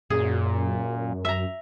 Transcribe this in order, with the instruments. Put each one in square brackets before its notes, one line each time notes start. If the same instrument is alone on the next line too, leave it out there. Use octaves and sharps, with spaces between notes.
[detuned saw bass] F#2 [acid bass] A#2 [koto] G#4
[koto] E5 A#5